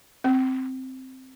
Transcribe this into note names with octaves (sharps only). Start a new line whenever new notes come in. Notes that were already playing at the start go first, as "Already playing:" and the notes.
C4